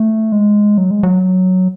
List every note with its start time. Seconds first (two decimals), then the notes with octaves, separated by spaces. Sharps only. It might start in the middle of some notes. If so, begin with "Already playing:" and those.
Already playing: A3
0.32 G#3
0.78 F#3
0.91 G#3
1.03 F#3